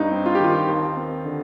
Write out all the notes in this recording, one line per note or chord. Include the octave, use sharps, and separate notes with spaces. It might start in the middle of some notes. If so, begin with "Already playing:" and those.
Already playing: G2 D#4
C4
F4
G4
D#3 F4
D#2
C4
D3